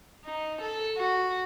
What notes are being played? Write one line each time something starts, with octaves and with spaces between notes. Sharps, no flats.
D#4
A4
F#4